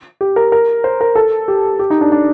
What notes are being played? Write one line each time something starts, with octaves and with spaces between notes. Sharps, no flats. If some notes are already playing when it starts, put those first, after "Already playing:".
G4
A#4
A#4
C5
A#4
A4
G4
G4
D#4
D4
D4